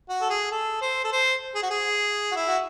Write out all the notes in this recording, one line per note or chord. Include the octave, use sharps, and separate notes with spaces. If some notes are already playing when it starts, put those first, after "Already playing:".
F#4
A4
G#4
A4
C5
A4
C5
G#4
F#4
G#4
F#4
E4
F#4